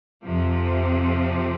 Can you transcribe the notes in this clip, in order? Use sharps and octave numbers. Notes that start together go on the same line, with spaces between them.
F2 C3 F3